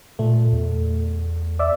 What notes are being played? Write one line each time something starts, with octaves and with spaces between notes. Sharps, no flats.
A#2 A3
E2
D5 E5